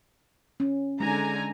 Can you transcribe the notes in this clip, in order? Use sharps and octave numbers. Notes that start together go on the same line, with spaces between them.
C#4
D3 G#3 D#4 G#5 A#5